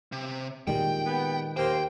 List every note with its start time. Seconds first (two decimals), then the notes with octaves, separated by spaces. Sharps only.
0.12 C3
0.67 A#2 D#3 G3 G#3 G5
1.05 B3
1.57 D#2 A#3 C5 G5